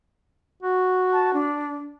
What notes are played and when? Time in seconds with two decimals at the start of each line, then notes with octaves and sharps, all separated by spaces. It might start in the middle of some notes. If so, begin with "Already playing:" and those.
0.63 F#4
1.12 A5
1.33 D4